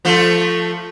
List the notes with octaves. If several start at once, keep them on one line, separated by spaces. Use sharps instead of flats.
F3 A3 F4